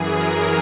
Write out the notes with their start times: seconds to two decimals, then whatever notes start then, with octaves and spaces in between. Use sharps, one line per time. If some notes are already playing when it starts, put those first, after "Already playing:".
Already playing: F#2 E3 G#4
0.10 A#4